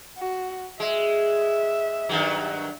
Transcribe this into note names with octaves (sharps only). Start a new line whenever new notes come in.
F#4
G#3 E5
G2 D#3 F#3